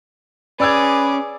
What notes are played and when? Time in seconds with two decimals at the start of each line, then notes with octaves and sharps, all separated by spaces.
0.60 C#4 G#4 B4 D5 D6 E6 G#6